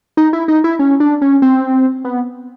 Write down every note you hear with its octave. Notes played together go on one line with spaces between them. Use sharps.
D#4
E4
D#4
E4
C#4
D4
C#4
C4
B3